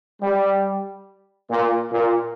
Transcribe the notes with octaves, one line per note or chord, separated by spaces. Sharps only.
G3
A#2
A#2